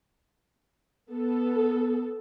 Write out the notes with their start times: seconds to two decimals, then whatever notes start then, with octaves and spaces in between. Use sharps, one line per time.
1.11 B3 A4